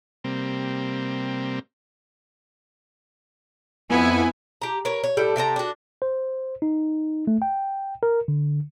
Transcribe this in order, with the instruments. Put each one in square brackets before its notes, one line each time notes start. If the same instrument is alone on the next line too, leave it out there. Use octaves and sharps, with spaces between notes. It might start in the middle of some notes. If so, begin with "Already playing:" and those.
[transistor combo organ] C3 G3 A#3 C4
[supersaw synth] F2 E4 G#5 [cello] B3
[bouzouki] G4 A#5
A#4 B4 C#5
C#5
A2 G3 A4 G5
C3 G5 A5 A#5
D4 F#4
[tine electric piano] C5
D#4
A3
G5
A#4
D3